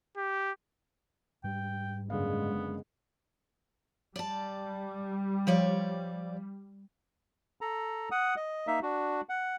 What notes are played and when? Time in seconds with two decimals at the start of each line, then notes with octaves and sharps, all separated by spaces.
0.17 G4
1.44 G#2 G3 G5
2.10 F#1 D3 G#3 B3 F5
4.16 G3 D5 A5
5.47 F3 C#5 D5
7.61 A4 A#5
8.11 F#5 D#6
8.37 D#5
8.67 A#3 D#4 E5
8.83 D4 F#4
9.29 F#5